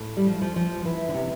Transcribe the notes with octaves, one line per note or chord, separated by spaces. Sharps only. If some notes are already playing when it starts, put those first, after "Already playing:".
Already playing: A2
G3
F3
F3
F3
E3
D3
C3